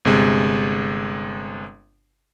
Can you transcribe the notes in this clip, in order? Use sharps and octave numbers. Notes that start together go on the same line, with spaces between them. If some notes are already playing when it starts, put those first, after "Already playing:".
G1 C3 G#3